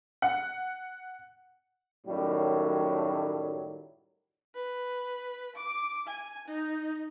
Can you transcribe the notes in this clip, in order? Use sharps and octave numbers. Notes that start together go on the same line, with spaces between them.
F#5
F#2 A2 D#3 F#3 G3 A3
B4
D6
G#5
D#4